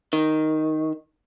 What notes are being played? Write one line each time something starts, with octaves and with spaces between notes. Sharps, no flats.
D#3